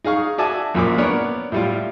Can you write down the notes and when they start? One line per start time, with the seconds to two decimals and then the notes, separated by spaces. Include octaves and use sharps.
0.05 D#4 G#4 F5 C#6
0.38 F#4 D5 E5 G#5 A5 D6
0.74 A#1 F#2 A#2 D6
0.98 B3 D4 A#4 C#5 D5
1.52 A2 G3 F4